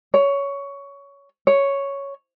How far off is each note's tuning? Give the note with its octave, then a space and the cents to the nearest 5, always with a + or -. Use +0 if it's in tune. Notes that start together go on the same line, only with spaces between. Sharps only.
C#5 +15
C#5 +0